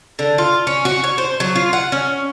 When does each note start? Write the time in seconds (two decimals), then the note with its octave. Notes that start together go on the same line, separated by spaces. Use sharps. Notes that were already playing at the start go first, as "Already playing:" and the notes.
0.19 D3
0.38 F4
0.67 C#4
0.85 F#4
1.04 C#5
1.18 C5
1.40 F#3
1.56 F4
1.73 F#5
1.92 C#4